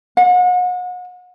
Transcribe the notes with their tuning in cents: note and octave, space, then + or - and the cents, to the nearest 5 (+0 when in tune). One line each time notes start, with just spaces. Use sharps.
F#5 -35